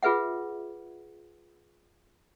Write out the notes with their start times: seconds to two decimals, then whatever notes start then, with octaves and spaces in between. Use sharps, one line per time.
0.03 F4 G#4 B4 E5 F#5